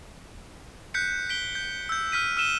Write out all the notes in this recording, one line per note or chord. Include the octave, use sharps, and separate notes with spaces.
F#6 G6 B6 C#7
B6 D7 G7
G6
E6 G6
F6 B6 D#7
E6 F6 D#7 E7 G7